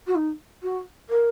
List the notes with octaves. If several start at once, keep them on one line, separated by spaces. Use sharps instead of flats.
F#4
D#4
F#4
A#4